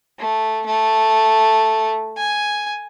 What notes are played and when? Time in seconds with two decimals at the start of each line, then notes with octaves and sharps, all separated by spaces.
0.19 A3
0.66 A3
2.17 G#5